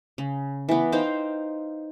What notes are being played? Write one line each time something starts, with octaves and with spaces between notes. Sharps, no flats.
C#3
E3 B3
D#4 C5 F5 G5